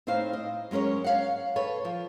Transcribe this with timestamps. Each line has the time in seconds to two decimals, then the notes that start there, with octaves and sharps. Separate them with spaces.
0.07 A2 C4 D#4 C5 F5
0.33 D#5
0.71 F#3 G#3 C#4 A#4 C#5
1.04 C#5 F5 F#5
1.56 A4 B4 C#5
1.85 F3